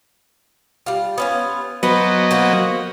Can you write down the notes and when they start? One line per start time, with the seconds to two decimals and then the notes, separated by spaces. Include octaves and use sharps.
0.86 G3 F4
1.18 B3 C#4 F4
1.83 F#3 B3 B4 C5 D#5
2.31 A#3 F#4 C5